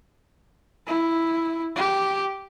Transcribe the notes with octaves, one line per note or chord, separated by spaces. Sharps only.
E4
G4